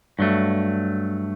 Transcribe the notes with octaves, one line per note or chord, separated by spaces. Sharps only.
G2 F#3 A3